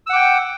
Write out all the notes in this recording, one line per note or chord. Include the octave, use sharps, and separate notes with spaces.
F#5 G5 D6 E6